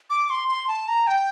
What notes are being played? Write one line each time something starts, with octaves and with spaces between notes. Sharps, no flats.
D6
C6
C6
A5
A#5
G5